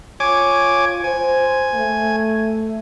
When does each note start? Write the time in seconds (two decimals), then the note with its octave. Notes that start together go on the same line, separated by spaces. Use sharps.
0.20 F4 C#5 G#5 D6
1.04 C5 G#5
1.74 A3